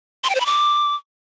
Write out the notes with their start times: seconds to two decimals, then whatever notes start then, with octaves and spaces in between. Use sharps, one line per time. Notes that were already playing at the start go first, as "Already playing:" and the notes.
0.24 C6
0.30 G5
0.35 C5
0.40 B5
0.46 D6